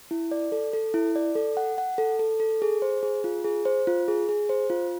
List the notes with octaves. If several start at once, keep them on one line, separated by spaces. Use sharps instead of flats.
E4
D5
A4
A4
E4
D5
A4
F#5
F#5
A4
A4
A4
G#4
C5
G#4
F4
G#4
C5
F4
G#4
G#4
C5
F4